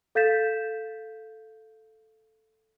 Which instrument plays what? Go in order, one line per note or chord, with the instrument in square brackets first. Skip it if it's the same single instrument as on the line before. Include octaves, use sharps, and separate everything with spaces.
[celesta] A4 F5 G6 A6 B6 E7